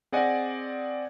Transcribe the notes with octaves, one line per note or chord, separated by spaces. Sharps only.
C4 G#4 D5 D#5 F#5 G#5